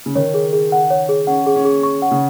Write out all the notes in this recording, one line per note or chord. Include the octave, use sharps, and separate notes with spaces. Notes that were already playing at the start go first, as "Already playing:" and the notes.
C#3
D#3 C#5
G#4
G#4
F#5
C#5
G#4
C#4 F#5
G#4
C#4
G#4
C#6
F#5
C#3